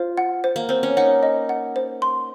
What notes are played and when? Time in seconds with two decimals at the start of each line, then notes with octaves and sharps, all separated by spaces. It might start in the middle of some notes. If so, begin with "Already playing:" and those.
Already playing: F4 C5
0.17 F#5
0.44 C5
0.56 A#3
0.69 C4 C5
0.83 C#4
0.97 D#4 F#5
1.23 D#5
1.49 F#5
1.76 C5
2.02 C6